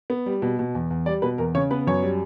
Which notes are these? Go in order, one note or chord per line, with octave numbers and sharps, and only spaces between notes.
B3
G3
B2
B2
E2
E2
G3 D5
B2 B4
E2 A#4
C#3 C#5
B3 B4
F#2 C#5
G3